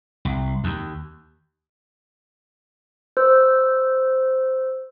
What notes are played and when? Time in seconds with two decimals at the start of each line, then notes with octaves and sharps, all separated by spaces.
0.25 C2
0.64 D#2
3.17 C5 E6